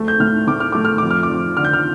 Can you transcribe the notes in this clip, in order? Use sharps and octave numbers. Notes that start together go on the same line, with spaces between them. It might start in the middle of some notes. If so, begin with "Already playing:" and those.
Already playing: D2 A3
G6
A2 F6
A2 D6
F6
A3 D6
F6
F2 D6
F6
D6
F2
D3 F6
G6
F6